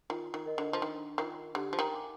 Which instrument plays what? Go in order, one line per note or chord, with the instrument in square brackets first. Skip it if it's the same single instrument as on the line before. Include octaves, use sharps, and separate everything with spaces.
[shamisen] D#3 [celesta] F4
[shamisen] D#3
[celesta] A#4 D#5
[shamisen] D3
F3
[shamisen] D#3 [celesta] D4
[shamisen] D#3 [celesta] F4 A#4
[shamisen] D3 [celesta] G4
[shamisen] F3
D#3
[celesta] A#4 F5 G#5 D6